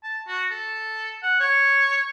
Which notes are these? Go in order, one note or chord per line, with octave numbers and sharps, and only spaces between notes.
A5
F#4
A4
F#5
C#5